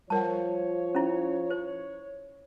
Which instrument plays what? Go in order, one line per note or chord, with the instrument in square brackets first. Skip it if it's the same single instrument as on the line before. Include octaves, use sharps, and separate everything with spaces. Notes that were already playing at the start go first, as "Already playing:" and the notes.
[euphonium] F3 [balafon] G3 A#4 F#5 [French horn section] C#5 [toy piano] A5
[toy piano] C#4 E4
C5